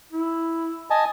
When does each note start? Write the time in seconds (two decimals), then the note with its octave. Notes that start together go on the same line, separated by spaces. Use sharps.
0.12 E4
0.90 D#5 G#5 A5